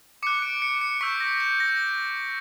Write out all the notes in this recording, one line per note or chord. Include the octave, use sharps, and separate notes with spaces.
D6 F#6 C#7
D7
C#7
C#7
C#6 E6 G6 B6
A#6
G6
A#6